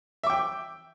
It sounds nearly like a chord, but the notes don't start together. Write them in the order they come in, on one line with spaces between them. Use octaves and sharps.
E5 D6 G5